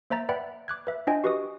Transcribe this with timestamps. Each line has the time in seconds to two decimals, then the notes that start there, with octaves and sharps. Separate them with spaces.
0.10 A#3 C5 E5 A#5 A6
0.29 B4 D5 E5 F#5 G5 B5
0.68 D6 F#6 G#6
0.87 B4 E5
1.07 D4 F4 C5 D#5 G5 G#5
1.24 F#4 G4 B4 D#5 C#6 D#6